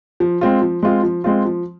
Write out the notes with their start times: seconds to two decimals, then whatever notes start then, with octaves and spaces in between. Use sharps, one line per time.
0.20 F3
0.41 G#3 C4 F4
0.62 F3
0.83 G#3 C4 F4
1.03 F3
1.24 G#3 C4 F4
1.45 F3